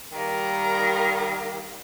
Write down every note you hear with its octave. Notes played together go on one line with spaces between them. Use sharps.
D#3 G3 A#3 A#4